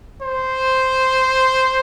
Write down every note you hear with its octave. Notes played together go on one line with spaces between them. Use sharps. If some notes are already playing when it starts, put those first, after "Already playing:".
C5